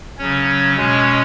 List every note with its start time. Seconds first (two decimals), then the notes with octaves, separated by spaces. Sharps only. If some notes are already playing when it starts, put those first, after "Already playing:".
0.18 C#3 F#3 C#4 C#5
0.76 B2 G#3 C#4 C#5